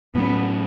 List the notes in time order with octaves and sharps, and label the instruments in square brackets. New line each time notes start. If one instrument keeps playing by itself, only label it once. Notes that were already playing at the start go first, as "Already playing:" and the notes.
[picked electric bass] A2 F#3 C#4 [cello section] B3